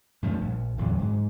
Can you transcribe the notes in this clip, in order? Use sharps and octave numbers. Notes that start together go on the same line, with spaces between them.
G2 F3 A3
A#1
D1 E2 F#3
G#2